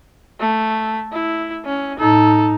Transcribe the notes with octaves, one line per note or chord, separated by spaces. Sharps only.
A3
E4
C#4
A2 D#4 A4